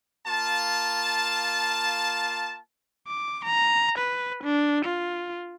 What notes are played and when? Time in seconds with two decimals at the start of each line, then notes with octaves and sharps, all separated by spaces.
0.25 A#3 F4 A5
3.08 D6
3.44 A#5
3.98 B4
4.43 D4
4.85 F4